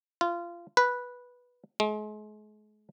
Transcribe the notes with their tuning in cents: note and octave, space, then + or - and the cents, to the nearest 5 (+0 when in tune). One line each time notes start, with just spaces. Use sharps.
F4 -20
B4 -10
G#3 +40